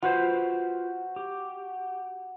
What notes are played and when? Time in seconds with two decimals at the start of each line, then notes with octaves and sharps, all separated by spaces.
0.02 F4 F#4 B4 C5
1.16 G4